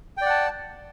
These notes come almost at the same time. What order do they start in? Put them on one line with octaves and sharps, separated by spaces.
G5 D5 F#5 A5